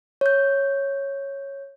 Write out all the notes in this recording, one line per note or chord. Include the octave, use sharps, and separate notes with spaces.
C#5 G6